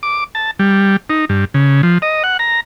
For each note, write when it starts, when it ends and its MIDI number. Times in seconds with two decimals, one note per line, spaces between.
0.03 0.24 86
0.35 0.51 81
0.59 0.97 55
1.10 1.25 63
1.29 1.45 43
1.54 1.82 49
1.83 1.98 53
2.02 2.23 75
2.24 2.37 78
2.39 2.60 82